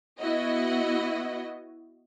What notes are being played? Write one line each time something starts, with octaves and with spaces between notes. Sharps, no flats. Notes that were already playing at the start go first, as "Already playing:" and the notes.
B3 E4 F#4 D#5